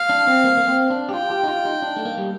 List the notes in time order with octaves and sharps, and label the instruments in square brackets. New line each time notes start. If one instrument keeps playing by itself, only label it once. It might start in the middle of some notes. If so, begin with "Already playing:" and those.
Already playing: [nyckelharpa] F5
[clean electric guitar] D4
C4
A#3
A#3
C4
D4
G4
[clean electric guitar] F4 [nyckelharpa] G5
[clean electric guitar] G4
D#4
F4
D#4
D4
A3
A#3
G3